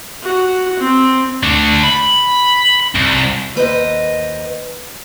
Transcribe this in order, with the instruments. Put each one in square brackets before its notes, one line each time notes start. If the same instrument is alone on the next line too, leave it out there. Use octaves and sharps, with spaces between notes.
[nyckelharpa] F#4
C4
[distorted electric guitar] A3 D4
B5
C2
[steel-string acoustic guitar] D#2 B4 C5 D#5